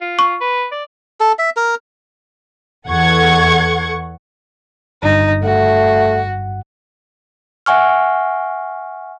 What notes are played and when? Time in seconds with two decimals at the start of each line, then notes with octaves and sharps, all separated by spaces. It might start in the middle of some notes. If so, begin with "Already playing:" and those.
0.01 F4
0.19 C#6
0.41 B4
0.72 D5
1.20 A4
1.39 E5
1.56 A#4
2.88 E2 A4 F#5 C#6 G#6
5.03 G1 G2 D#4
5.43 A3 F#4
7.66 E5 F#5 G#5 C#6 F6